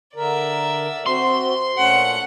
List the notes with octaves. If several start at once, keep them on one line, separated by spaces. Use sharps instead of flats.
D3 A#4 D5 E5
C4 F#4 C5 C6
A#2 A3 C#4 F#5